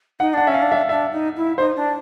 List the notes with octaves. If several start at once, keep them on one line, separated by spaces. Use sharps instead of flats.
D#4 F#5
D4 F#5
C#4 E5
F5
D4
E5
D4 E5
D#4
E4
D#4 C5
D4